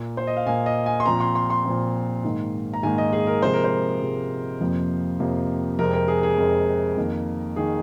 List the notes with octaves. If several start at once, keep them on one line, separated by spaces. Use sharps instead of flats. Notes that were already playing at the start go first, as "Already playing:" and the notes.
Already playing: A#2 A#3
C5
D#5
F5
A#2 A#3 G#5
D#5
G#5
C6
A#2 F3 C4 A#5
C6
C6
C6
A#2 F3 C4
G#2 D#3 A#3
A#5
G#2 D#3 A#3 G#5
D#5
G#4
A#4
C3 F3 G#3 C5
A#4
C5
C3 F3 G#3
F2 C3 F3 A#3
F2 C3 F3 A#3
F2 C3 G#3 C4 A#4
A#4
G#4
G#4
F2 C3 G#3 C4 A#4
F2 D#3 A#3
D#3 A#3 G#4